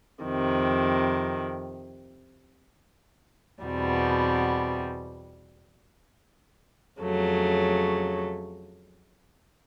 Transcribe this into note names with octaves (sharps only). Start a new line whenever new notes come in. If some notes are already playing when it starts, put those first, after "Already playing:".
F2 C3 D#3
E2 B2 G3 C4
F2 C#3 F#3 A3